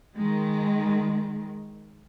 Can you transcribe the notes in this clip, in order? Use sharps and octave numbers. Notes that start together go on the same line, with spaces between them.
D#3 G#3